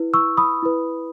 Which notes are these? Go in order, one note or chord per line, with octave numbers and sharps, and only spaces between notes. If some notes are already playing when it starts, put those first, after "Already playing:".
Already playing: E4 B4
C#6 E6
B5 D#6
E4 B4